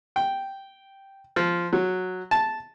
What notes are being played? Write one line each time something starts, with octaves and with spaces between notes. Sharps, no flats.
G5
F3
F#3
A5